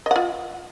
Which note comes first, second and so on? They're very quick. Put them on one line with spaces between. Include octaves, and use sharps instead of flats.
D#5 F#5 F4